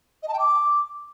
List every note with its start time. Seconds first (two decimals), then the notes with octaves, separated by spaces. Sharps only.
0.22 D#5
0.28 A5
0.33 G5
0.39 D6